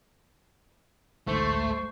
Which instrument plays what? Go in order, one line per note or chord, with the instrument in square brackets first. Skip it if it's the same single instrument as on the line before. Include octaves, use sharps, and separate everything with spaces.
[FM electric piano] A1 D2 G#2 [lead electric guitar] A3 [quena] C5 [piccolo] C#6